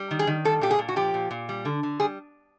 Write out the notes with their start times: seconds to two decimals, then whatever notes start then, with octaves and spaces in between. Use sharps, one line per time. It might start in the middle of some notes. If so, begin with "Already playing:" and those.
Already playing: G3
0.11 D#3
0.19 G#4
0.27 D#3
0.45 G3 A4
0.61 A#2 G4
0.71 G#4
0.79 A#2
0.89 F#4
0.96 F3 G4
1.14 A#2
1.31 A#2
1.49 G3
1.65 D3
1.83 D3
2.00 G3 G#4